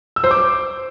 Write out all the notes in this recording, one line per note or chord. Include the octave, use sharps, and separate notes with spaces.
E6
C5
D6